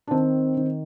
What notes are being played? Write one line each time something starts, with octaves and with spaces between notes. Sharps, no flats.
D4
D#3 C4
D#3